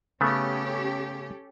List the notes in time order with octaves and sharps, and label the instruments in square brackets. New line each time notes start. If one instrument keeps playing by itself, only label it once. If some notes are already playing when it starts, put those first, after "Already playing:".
[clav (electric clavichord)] C#3 A3 B3 [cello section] C#4 G4 A4